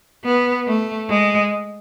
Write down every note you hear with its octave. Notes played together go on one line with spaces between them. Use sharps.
B3
A3
G#3